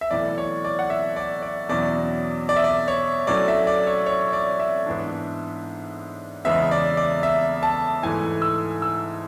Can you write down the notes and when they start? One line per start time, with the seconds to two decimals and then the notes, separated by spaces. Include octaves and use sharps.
0.01 E5
0.11 B1 A2 E3 D5
0.38 C#5
0.65 D5
0.79 F#5
0.90 E5
1.16 D5
1.43 D5
1.69 E2 B2 F#3 C#4 E4 D5
2.49 D5
2.56 E5
2.64 D5
2.88 C#5
3.27 A2 F#3 A3 C#4 E4 D5
3.48 E5
3.67 D5
3.87 C#5
4.06 C#5
4.33 D5
4.59 E5
4.86 G#2 E3 B3 D4
6.45 E2 C#3 G#3 B3 E5
6.71 D5
6.97 D5
7.23 E5
7.63 A5
8.03 G#2 E3 A3 E4 G#5
8.42 E6
8.82 E6